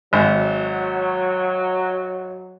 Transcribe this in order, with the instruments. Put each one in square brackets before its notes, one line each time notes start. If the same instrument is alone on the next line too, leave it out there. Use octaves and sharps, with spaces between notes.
[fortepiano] G#1 [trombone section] F#3